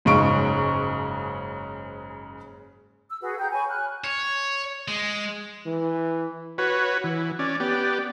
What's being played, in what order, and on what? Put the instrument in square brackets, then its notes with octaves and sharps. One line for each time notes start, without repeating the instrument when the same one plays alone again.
[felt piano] F#1 G#2 C#3 C#6 D7
[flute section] E6
F#4 G#4 B4
G5 A#5 G6
C#5 G#5 B5 C#6
F6 F#6
[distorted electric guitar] C#5
G#3
[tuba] E3
[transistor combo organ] F#4 B4 C#5
E3
C#4 D5
B3 G4 D5